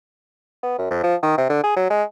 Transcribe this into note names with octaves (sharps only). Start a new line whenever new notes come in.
B3
F#2
F2
F3
D#3
C3
D3
G#4
F#3
G#3